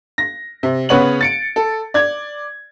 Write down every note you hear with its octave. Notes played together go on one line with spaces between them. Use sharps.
A#6
C3
C#3 B3 B4 C#5 F#5 F#7
A6 C#7 D7
A4
D5 G#6